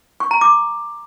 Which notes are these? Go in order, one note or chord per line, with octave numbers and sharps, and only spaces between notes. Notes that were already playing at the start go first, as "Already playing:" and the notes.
C#6
A#5
D6